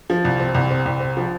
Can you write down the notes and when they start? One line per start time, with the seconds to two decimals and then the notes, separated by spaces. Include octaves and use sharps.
0.10 F3
0.25 C2
0.40 C4
0.54 C2
0.71 C4
0.86 C2
1.00 C4
1.17 F3